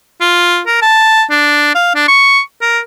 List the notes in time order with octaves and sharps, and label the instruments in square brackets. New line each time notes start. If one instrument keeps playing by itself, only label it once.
[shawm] F4
A#4
A5
D4
F5
D4
C#6
A#4